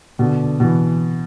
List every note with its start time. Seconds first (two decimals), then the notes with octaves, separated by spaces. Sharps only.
0.19 B2 D3
0.60 B2 E3